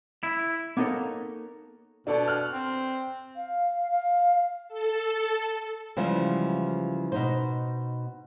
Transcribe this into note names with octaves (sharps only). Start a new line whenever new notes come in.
E4
A#3 B3 D#4 A4 A#4 C#5
B2 D4 A4 D5
F6 F#6
C4
F5
F5
A4
C#3 E3 F3 G3 G#3 B3
B2 D#4 C5